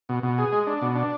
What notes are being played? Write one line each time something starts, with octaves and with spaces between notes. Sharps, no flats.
B2
B2
G#4
G#3
D4
B2
D4